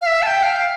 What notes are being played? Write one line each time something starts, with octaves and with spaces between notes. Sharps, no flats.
F5
E5
A5
G5
F5